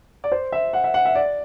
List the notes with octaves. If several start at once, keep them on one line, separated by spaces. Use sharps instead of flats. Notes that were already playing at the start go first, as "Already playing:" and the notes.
D5
C5
E5
F#5
E5
F#5
E5
D5